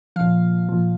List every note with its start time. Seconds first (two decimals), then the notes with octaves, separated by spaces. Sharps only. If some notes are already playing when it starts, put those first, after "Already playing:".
0.16 A#2 F3 F5
0.69 A#2 F3